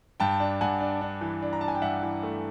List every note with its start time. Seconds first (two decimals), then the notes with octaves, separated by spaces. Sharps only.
0.20 G2 G5 A5
0.40 D4
0.61 G2 F#5 G#5
0.80 D4
1.01 D4
1.21 E3
1.42 D4
1.53 A#5
1.61 D4 A5
1.68 G#5
1.75 G5
1.82 G2 E5 F#5
2.03 E3
2.23 A3